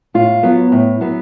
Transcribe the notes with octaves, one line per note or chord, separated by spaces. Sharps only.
A2 F4
F#3 B3
A2
F#3 B3